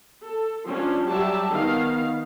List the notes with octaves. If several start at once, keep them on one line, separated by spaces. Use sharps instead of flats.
A4
F3 C#4 D4
F#3 G3 G4 D5 E5 A5
D#3 B3 F5